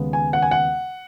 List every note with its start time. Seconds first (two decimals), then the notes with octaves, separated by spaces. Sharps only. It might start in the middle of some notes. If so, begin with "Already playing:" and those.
Already playing: D#2 C#3 G#3 B3
0.13 G#5
0.33 F#5
0.42 G#5
0.51 F#5